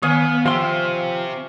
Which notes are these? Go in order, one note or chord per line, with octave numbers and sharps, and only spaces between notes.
D#3 B3 C#5 F5 F#5 G#5 D#6
F3 C4 F4 G4 E5 F5 C6